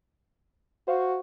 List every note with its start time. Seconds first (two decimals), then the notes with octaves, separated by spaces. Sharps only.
0.88 F#4 C5 F5 C#6